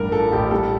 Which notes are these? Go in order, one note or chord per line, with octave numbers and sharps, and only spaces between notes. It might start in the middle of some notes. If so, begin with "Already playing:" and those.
Already playing: A1 G2 A#4
F3 A4
A1 G4
G3 A4